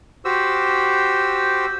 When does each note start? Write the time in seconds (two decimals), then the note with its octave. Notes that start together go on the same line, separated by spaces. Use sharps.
0.25 F#4 G4 C5 E6